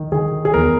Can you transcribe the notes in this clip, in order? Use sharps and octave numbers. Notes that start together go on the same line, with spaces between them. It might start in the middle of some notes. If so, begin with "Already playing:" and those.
Already playing: D#3
D#3 G#4
G#4
E2 A#4